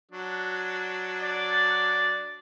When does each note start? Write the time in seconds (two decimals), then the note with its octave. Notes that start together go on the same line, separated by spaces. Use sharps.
0.11 F#3 D4
1.21 D5